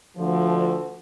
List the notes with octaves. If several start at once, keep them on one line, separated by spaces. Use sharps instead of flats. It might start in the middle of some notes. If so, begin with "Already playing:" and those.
D2 D3 F3